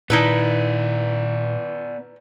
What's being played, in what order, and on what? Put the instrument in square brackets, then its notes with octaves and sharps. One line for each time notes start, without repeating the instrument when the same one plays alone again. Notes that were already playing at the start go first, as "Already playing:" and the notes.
[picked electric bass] A#2 D#3 [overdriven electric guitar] B3 D5 [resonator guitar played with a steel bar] D#4 E4 B4